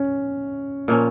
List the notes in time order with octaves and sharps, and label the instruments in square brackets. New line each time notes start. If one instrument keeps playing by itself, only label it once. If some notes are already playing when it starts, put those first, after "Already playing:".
Already playing: [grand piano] C#4
[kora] A#2 F3 A#3 C#4